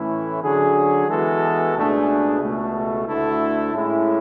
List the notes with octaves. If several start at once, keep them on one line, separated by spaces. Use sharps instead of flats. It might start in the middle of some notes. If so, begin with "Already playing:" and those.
Already playing: A2 E3 A3 C#4 E4
D3 F#3 C#4 G#4
E3 G#3 B3 F#4 A4
C#2 B2 A3 D4 G#4
C#2 B2 A3
D2 D3 A3 E4 A4
A2 G#3 C#4 E4